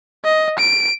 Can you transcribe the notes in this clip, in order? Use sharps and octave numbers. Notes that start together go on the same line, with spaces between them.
D#5
D7